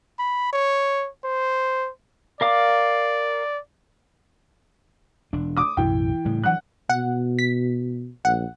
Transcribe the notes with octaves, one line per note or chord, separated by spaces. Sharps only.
B5
C#5
C5
A#4 D5 F5 D6
E1 D4
D6 D#6
B1 F#2 A2 E3 G5
A2 C#3 G3
E3 F#3 F#5 F#6
B2 F#5
B6
A#1 F#5